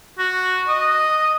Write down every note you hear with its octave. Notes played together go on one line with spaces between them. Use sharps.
F#4
D#5